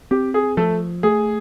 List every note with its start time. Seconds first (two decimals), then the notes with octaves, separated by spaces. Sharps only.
0.11 C4 G4
0.34 G#4
0.57 F3 A3 A4
1.03 A3 G#4